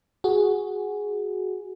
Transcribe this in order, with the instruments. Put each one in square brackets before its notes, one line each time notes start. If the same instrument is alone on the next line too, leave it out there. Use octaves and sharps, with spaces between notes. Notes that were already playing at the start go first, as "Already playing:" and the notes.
[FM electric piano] F#4 G#4